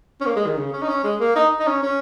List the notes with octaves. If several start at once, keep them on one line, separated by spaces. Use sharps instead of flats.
C#4
A#3
G#3
D#3
C#3
C#4
D#4
C#4
G#3
A#3
D#4
D#4
C#4
C#4